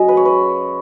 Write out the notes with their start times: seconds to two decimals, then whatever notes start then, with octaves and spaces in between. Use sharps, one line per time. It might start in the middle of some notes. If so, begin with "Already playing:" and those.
Already playing: F#2 C#3 F#3 C#4 D#5
0.08 B4
0.17 C#5
0.25 B4